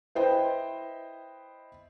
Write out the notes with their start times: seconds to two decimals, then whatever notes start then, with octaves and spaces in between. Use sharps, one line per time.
0.15 E4 B4 C5 D#5 G5